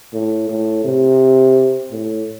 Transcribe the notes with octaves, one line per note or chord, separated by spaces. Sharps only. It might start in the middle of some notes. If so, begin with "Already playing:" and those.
A2
A2
C3
A2